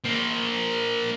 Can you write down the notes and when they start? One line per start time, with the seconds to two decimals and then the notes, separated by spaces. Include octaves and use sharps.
0.04 A#3 C5